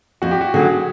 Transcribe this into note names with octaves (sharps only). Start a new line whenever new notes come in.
F2 F#4
G4
F#4
D3 F#3 G#4